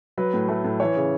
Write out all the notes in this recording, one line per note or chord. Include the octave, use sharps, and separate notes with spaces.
F#3 B4
A2
A3
A2
E3 C#5
C#3